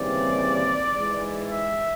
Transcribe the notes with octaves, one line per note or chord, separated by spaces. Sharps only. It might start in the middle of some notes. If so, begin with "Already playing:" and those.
Already playing: D#2 C#3 E3 G3 C4 D5
G#2 E3 G#3
E5